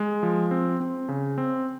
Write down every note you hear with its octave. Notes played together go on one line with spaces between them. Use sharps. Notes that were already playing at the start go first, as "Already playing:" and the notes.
Already playing: G#3
F3
C4
C4
C#3
C4